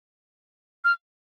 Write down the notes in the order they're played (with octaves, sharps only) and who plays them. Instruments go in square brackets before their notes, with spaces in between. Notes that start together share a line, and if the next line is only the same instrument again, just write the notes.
[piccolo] F6